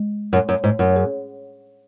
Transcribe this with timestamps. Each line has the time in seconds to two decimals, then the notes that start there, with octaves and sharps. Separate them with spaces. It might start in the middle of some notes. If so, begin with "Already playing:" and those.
Already playing: G#3
0.33 F#2
0.49 F#2
0.64 G#2
0.79 F#2
0.95 C#4 G#4 C#5